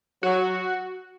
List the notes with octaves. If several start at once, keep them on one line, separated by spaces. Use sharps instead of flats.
F#3 F#4